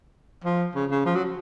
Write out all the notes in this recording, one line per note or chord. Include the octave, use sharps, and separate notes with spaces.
F3
C#3
C#3
F3
F#3